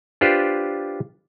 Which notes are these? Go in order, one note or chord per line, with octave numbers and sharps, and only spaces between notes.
D4 F4 G4 B4 C5 D5